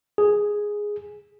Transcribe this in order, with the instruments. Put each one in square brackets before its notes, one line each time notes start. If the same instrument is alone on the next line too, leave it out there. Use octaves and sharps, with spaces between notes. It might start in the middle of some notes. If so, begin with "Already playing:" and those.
[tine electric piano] G#4